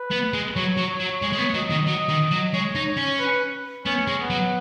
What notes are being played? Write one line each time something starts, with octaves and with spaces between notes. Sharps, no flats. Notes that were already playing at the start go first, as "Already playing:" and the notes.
Already playing: B4
B3
G#3
F#3 C#5
F#3
C#5
F#3
G#3 C#5
G#3
B3
F#3 D#5
D#3
F#3 D#5
D#3
F#3
G#3 C#5
D#4
C#5
C#4
B4
B3 C#4
G#3
B3
F#3